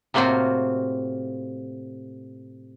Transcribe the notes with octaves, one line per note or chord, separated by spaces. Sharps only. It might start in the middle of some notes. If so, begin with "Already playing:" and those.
A2 C3 A#3 C4 F4 F#4